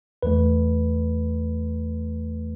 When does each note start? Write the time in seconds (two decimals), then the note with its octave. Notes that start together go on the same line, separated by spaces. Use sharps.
0.23 E2 E3 A3 B4